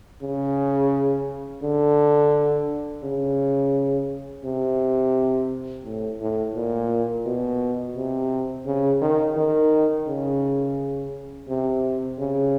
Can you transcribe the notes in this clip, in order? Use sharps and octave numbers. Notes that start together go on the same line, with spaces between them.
C#3
D3
C#3
C3
A2
A2
A#2
B2
C3
C#3
D#3
D#3
C#3
C3
C#3